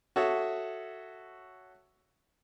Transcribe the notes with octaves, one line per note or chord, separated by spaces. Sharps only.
F#4 A4 C#5 E5 D#6